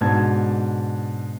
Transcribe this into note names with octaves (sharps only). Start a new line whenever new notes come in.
G#2 B2 D4 A5 G#6